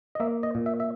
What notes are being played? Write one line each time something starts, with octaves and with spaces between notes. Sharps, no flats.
D#5
A#3 E5
D#5
A#2
E5
E5